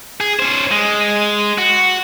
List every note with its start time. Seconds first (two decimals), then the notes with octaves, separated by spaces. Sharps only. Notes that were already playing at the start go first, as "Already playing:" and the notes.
0.20 G#4
0.39 C#4 C5
0.71 G#3
1.58 F#4